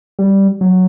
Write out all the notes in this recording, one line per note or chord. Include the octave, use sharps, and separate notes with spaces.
G3
F#3